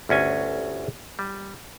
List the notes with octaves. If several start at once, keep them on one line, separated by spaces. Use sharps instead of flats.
G1 D2 C#4 G#5
G3